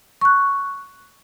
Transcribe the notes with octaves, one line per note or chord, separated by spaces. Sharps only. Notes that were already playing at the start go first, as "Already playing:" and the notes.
C#6 F#6